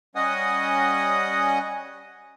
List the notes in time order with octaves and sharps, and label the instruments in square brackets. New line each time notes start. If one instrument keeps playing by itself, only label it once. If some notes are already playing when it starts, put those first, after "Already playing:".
[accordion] G3 C#4 D#5 F#5 G#5 D#6